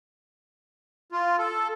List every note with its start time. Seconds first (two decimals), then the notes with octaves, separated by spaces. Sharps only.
1.12 F4
1.38 A4